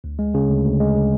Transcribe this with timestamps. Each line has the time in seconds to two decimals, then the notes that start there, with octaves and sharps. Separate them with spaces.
0.04 D2
0.19 G#3
0.34 C#3
0.49 D2
0.65 D2
0.80 G#3
0.95 C#3